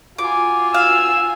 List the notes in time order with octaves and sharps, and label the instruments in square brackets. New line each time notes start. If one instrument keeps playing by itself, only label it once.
[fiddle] F4 G#5 [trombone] F#4 [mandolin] D6
[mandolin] F5 [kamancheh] E6